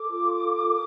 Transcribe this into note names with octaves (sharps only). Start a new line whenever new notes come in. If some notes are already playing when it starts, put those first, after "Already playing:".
Already playing: A4 D6
F4
A4
A#4